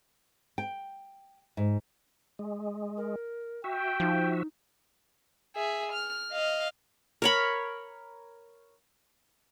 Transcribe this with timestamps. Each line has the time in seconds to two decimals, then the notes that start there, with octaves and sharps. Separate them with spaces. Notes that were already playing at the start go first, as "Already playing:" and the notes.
0.58 G5
1.57 G#2
2.39 G#3
2.97 A#4
3.64 F#4 E5 G5
4.00 F3 D#4
5.55 G#4 E5
5.92 F6
6.32 D#5 F5
7.22 A#4 C#5 B5